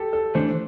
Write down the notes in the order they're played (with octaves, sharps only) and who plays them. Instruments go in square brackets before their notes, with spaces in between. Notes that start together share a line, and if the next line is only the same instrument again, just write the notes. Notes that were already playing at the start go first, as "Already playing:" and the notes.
Already playing: [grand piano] G4 A4
A4
[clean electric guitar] E3 A3 D4 [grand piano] C5